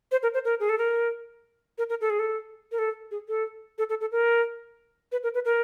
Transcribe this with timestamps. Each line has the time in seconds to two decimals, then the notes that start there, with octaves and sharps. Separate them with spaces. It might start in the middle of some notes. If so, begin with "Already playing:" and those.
0.12 C5
0.23 A#4
0.34 C5
0.45 A#4
0.60 G#4
0.69 A4
0.78 A#4
1.78 A#4
1.90 A#4
2.01 A4
2.10 G#4
2.19 A4
2.72 A#4
2.79 A4
3.11 G#4
3.28 A4
3.78 A4
3.89 A4
4.01 A4
4.12 A#4
5.12 B4
5.23 A#4
5.34 B4
5.45 A#4